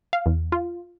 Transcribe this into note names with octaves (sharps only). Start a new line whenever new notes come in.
F5
E2
F4